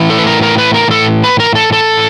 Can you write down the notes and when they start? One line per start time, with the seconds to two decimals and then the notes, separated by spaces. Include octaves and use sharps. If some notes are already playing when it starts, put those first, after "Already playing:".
Already playing: A2 E3
0.10 A4
0.19 B4
0.27 A#4
0.42 A#4
0.58 B4
0.74 A#4
0.91 A4
1.24 B4
1.40 A#4
1.55 A4
1.73 A4